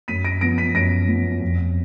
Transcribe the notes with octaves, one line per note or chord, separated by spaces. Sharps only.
F#2 B6 D#7
A#6 D7
F3 B3 A#6 D7
B6 D#7
F#2 A#6 D7
F3 B3
F2